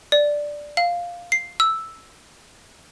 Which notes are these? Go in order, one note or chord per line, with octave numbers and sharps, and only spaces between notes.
D5
F5
C7
E6